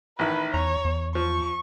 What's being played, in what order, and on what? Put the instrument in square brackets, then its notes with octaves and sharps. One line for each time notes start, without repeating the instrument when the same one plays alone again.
[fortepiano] A1 D#3 E4 [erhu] B4
[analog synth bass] E2 [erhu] C#5 [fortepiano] A#5
[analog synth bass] E2
[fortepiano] F3 [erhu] C#6